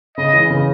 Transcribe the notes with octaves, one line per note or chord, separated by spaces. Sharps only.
C#3 D#5
E3
C#3